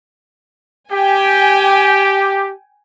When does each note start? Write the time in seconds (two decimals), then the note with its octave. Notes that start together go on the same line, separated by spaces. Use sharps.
0.92 G4 G5 G#5